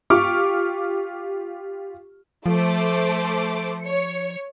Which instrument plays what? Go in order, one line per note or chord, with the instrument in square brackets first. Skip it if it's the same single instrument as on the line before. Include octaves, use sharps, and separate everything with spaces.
[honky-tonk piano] F4 G4 C#6 D6 F6
[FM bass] F3 [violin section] A3 C5 D6
[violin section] C#5 C#7